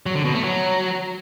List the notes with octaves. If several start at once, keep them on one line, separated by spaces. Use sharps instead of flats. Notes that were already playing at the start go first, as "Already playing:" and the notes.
F#3
D3
B2
A3
F#3